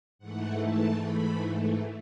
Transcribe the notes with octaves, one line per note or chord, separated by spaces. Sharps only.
G#2 E3 A3 F#5
A5
B5